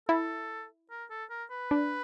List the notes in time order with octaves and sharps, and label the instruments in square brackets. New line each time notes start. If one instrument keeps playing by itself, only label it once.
[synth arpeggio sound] E4 [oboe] A4
[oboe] A#4
A4
A#4
B4
[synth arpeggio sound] D4